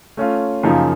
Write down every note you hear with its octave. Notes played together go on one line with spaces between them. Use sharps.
A3 C#4 F4
F#2 C#3 F3 A#3 D#4